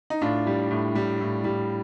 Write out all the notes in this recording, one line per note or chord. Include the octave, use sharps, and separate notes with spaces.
D#4
A2 D4 F4
G3
A2
G3
A2
G3